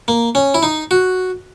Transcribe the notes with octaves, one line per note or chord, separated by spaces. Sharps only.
A#3
C#4
E4
D#4
F#4